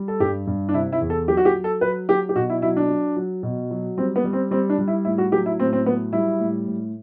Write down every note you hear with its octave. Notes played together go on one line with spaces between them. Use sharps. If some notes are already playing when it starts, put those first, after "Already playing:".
Already playing: G3
A4
G2 G4
G2
D4
C3 E4
E4
E2
A4
F#3 G4
F#4
G4
F#3
A4
F#3 B4
F#3 G4
G4
B2 F#4
E4
F#3 E4
D4
F#3
F#3
B2
F#3
G3 C4
B3
G3
C4
G3 C4
D4
G3
E4
A2 E4
F#4
F#3 G4
E4
A2 C4
C4
F#3 B3
G3 E4
A2
A2